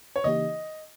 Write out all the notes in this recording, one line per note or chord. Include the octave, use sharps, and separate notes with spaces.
C#5
C#3 E3 A#3 D#4 G4 D#5